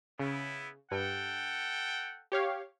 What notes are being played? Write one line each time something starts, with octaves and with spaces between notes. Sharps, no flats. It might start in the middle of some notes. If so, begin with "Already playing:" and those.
C#3 B3 E4
G2 A4 F#5 G5
G4 C#5 F5